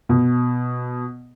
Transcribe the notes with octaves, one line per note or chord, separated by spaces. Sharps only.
B2